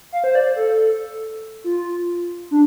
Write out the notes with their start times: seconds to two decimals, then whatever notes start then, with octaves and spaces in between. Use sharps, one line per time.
0.12 F5
0.24 C5
0.35 D5
0.56 A4
1.64 F4
2.51 D4